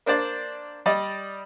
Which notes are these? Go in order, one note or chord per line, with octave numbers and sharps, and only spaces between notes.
A#3 D4 C5 D5
G3 D5 D#5